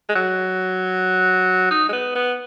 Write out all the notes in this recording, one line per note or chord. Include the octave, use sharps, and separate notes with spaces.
G#3
F#3
D#4
G#3
B3
B3